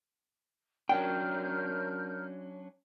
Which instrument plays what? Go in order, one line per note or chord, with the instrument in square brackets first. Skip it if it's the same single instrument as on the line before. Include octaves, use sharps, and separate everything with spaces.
[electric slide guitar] F#3 C#4 D4 [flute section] A#4 F6 G6 [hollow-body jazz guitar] G5